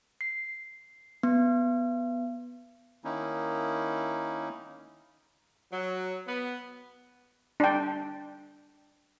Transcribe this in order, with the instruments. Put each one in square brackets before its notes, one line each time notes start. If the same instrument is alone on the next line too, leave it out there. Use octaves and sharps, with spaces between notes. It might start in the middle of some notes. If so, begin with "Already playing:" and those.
[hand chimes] C7
B3
[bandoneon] D#3 A#3 C#4 D#4 E4
[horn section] F#3
B3
[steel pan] D4 G5